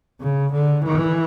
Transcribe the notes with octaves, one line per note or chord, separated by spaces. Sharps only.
C#3
D3
E3